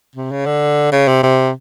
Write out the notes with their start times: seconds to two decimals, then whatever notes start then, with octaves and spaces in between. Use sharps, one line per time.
0.16 C3
0.31 C#3
0.46 D3
0.92 C#3
1.08 C3
1.23 C3